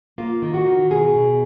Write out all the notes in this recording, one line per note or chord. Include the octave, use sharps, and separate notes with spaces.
A#3 F4
D#3
F#4
D#3
B2 G#4
B2